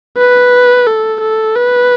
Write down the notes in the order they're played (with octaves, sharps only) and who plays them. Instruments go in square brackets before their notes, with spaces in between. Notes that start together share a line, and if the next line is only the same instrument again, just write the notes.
[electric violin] B4
A4
A4
B4